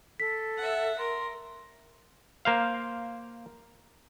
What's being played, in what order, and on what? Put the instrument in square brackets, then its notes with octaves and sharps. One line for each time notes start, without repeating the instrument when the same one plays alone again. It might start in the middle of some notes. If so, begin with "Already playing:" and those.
[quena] A4 [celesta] B6
[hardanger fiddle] E5 F#5
[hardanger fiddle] A#4 [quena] C6
[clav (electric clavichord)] A#3 C5 F5